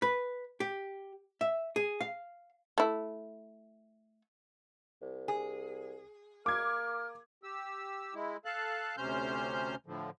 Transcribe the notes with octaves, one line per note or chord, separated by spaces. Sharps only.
B4
G4
E5
G#4
F5
A3 E4
C2
G#4
A#3 D6 F6 G#6
G4 E6
G#3 E4
A4 F5 A5 F#6
D2 C3 C#4 C5 F6 G6
A2 D3 F3